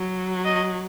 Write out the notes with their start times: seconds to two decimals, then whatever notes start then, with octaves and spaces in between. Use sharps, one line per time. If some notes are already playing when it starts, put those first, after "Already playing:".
Already playing: F#3
0.45 D#5